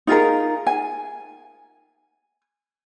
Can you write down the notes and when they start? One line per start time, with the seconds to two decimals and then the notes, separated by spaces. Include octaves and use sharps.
0.07 D#4 F4 G#4 A#4
0.67 G#5